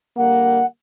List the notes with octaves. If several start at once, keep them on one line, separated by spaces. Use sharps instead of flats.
D3 G3 A#3 F#5